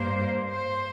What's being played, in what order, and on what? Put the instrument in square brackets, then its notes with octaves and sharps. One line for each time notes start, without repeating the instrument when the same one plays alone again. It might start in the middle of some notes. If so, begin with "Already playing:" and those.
Already playing: [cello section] G2 A#3 C5
C5